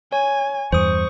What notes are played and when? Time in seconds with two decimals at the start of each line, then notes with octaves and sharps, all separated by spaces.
0.12 C#5 G#5
0.72 E2 G2 C5 C#6 D#6